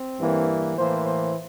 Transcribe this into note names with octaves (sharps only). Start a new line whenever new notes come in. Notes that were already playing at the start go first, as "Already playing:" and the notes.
Already playing: C4
G2 E3 A#3
A2 E3 A#3 C5
C5